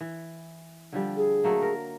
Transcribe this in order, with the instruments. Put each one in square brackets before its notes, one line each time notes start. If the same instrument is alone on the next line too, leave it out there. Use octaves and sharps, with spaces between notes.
[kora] E3
D3 F3 G3
[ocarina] G#4
[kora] F#3 A3 A#3
A#4